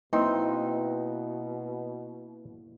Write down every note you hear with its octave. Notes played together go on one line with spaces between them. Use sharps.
B2 A#3 C4 D#4 E4 B4